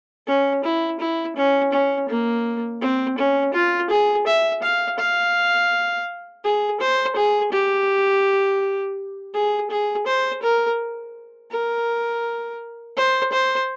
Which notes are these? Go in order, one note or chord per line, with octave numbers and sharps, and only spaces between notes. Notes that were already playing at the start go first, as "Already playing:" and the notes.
C#4
E4
E4
C#4
C#4
A#3
C4
C#4
F4
G#4
E5
F5
F5
G#4
C5
G#4
G4
G#4
G#4
C5
A#4
A#4
C5
C5